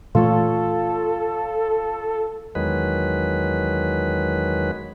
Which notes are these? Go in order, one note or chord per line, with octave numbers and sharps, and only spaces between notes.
A#2 E3 A3 F4 A4 C#5
E2 D#3 F#3 G#3 B4